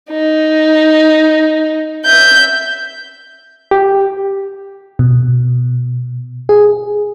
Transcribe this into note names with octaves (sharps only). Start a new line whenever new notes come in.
D#4
E5 G6
G4
B2
G#4